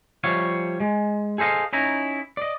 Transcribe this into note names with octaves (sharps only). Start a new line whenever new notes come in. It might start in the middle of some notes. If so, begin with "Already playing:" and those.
F3 G3 C#5 E5 F5
G#3
G#4 A4 C5 D#5 F5
C#4 D#4 E4 A#5
D5 D#5